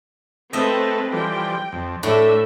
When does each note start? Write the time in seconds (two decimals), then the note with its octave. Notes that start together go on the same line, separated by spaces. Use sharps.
0.53 A3 C4 A4 B4 D#5 E5
1.13 E3 F3 G3 G5
1.72 F2
2.03 A2 A3 D4 E5